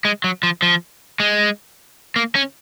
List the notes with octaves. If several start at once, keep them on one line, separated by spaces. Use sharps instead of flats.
G#3
F#3
F3
F3
G#3
A#3
C#4